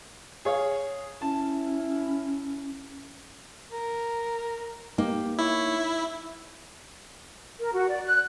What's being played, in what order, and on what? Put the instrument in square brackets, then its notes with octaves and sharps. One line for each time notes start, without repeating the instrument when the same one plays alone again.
[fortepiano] G#4 C#5 F5
[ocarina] C#4 [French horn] E4 [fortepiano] A5
[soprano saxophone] A#4
[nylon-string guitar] A#3 [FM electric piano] D#4 [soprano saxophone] G4
[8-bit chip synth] E4 [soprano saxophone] C#5
[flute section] A#4
F#4
D5
F#6